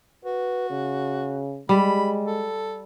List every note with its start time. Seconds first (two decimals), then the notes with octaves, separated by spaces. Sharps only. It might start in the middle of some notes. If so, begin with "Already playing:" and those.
0.25 F#4 B4
0.70 C#3
1.69 G3 G#3 B5
2.26 A4